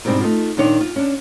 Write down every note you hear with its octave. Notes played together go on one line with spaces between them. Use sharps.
G#2 B2 G3 C4 D4
A3 D#4 F4
A#2 D#3 D4 C#5
F4
C#4 D4